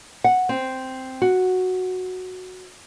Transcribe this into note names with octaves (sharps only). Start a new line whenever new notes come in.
F#5
C4
F#4